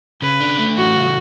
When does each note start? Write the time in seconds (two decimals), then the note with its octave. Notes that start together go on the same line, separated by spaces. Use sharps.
0.22 C#3 B4
0.41 D4
0.59 A3
0.77 E3 F#4
0.96 C#3